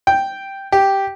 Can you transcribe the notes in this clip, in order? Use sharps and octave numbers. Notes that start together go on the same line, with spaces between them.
G5
G4